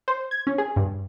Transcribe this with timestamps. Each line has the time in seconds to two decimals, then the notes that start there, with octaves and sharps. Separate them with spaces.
0.08 C5
0.31 G#6
0.47 C#4
0.58 G#4
0.76 G2